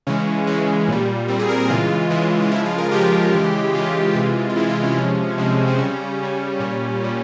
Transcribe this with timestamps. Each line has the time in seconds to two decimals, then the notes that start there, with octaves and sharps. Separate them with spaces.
0.07 C#3 E3 G#3 C#4
0.47 C#3 E3 G#3
0.88 A#2 G3
1.28 A#2 G3 C4
1.39 G#4
1.49 A#4
1.59 A#4
1.70 C#3 E3 G#3 F4
2.10 C#3 E3 G#3
2.42 F4
2.51 C#3 F3 G#3 E4
2.65 F4
2.78 A#4
2.92 C#3 F3 G#3 G4
3.33 C#3 E3 G#3
3.73 C#3 E3 G#3 F4
4.15 C3 E3 G#3
4.50 F4
4.56 C3 E3 G#3 E4
4.70 F4
4.83 C#4
4.97 C3 F3 G#3
5.38 C3 F3 G#3 C4
5.67 C4
5.78 C#3 G3 C#4
6.19 C#3 G3
6.60 A#2 G3
7.00 A#2 G3